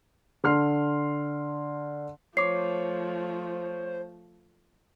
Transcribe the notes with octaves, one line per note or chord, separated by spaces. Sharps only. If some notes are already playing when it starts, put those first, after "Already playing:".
D3 C6 F6 C7
F3 A3 C5 C#5 D6 C7